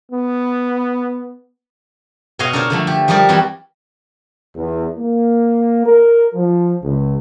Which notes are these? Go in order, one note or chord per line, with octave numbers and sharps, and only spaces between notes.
B3
B2 F#4 C#5 D#5 F5 C6
D4 F4 A#4 C5 C#5
D3 F3 A3
G4
F3 G3 D#4 G4 A#4 D5
E3 G3 C4 F#4
E2
A#3
A#4
F3
C#2